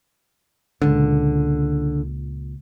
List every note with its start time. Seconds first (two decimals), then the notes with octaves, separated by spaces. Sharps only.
0.82 C#2 A#2 D3